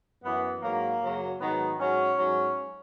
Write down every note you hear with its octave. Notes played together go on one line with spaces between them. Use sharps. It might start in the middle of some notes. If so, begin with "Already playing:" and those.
F#2 E3 B3
G#2 F#3 A#3
F#2 C#3 F#3
G#2 D#3 F#3 B3
G#2 F#3 C#4
G#2 F#3